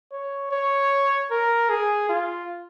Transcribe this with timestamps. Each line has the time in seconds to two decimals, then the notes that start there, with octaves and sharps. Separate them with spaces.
0.12 C#5
0.51 C#5
1.31 A#4
1.70 G#4
2.09 F4